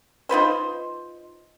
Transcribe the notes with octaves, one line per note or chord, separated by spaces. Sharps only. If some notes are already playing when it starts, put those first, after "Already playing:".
D#4 F4 B4 C5